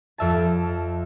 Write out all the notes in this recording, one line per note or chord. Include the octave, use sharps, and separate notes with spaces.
F2 E5 A5